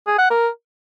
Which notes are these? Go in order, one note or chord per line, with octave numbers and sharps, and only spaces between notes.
G#4
F#5
A#4